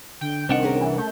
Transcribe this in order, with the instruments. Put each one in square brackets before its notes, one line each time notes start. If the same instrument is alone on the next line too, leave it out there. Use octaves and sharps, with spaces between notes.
[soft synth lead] D3 [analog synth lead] G5
[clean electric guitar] C2 D4 F#5 [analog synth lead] D#3 [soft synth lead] C4
[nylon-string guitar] C#4 G#4 A#4
[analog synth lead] E3
[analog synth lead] A3 [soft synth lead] G6